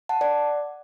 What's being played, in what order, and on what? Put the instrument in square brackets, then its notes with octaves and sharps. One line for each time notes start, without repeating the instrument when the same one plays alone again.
[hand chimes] F#5 A5
D5 F#5